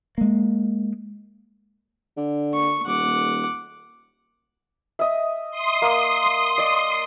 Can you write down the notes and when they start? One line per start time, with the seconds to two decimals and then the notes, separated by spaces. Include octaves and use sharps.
0.18 G#3 A#3
2.17 D3
2.54 C#6
2.86 D#1 F#5 D6
4.99 D#5 E5
5.51 C6 D#6
5.82 A#3
6.58 D5 D#5